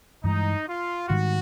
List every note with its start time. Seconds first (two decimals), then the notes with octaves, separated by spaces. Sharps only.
0.23 G2 E3 G#3 D#4
0.67 F4
1.09 G#2 D#3 G3 F#4